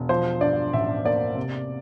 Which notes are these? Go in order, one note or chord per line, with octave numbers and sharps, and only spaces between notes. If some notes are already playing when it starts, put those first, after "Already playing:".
Already playing: E1
F3 C5
G2 D5
A1 E5
A#3 D5
C3